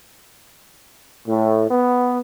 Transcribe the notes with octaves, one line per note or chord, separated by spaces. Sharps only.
A2
B3